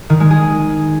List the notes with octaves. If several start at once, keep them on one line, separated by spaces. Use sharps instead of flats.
D#3
G#3
G#4